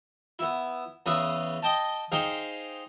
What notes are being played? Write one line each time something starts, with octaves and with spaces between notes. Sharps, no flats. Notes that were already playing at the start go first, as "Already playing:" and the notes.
B3 E4
E2 C#3 B4 E5 D#6
D#5 G5 A5
D#4 G#4 C5 F5 G5 G#5